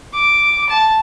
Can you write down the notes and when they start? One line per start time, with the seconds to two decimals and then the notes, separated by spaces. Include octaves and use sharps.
0.14 D6
0.69 A5